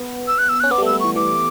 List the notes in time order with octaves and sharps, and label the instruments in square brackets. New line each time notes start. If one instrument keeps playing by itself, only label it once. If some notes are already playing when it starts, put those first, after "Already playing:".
Already playing: [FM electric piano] B3
[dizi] E6
F#6
E6
F#6
[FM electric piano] C#4
[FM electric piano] B3 [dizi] D6
[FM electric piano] G3
A3
[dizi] E6
[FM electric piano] A3
[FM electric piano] E3 [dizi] C#6
[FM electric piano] E3 [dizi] D6